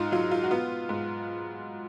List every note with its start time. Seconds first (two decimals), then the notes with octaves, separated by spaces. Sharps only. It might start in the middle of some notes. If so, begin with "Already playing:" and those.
Already playing: G#2 D#4 F4
0.12 F#3 F4
0.31 F4
0.44 F#4
0.51 B3 F4
0.89 G#2